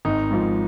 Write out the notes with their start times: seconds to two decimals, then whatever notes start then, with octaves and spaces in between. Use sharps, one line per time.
0.05 G#1 D#4
0.31 G#2 F3